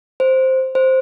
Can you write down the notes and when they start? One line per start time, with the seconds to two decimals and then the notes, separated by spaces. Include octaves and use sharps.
0.20 C5
0.75 C5